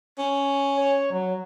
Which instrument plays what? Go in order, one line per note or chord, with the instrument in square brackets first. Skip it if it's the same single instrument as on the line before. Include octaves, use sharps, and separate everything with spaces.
[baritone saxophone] C#4
[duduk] C#5
F#3